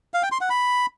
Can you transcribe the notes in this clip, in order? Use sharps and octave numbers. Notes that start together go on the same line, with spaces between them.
F5
G5
C6
F#5
B5